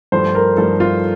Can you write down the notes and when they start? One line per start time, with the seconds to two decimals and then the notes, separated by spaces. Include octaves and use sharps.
0.12 G2 F3 A3 C5
0.35 A#4
0.57 G2 F3 A3 A4
0.80 F4